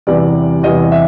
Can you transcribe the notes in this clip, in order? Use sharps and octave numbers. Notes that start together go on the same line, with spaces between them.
E2 C3 E3 G3 D5
E2 C3 E3 G3 D#5
E5